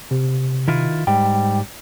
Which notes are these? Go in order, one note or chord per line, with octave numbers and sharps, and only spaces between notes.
C3
D#3 E4 F4
G#2 G3 G5